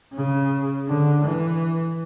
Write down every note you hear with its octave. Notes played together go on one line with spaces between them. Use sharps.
C#3
D3
E3